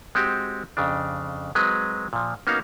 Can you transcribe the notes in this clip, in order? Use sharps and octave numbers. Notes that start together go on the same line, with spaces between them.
G#3 C4 F#4 G4
F2 C#3 D4
F#3 G#3 C4 B4
A#2 F3
A#3 B3 C#4 D#4 F#4 F5